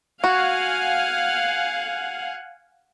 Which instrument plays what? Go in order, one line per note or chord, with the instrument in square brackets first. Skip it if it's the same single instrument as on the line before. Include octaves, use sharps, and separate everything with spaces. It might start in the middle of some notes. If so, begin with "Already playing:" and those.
[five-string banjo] F#4 [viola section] F5 F#5 G#5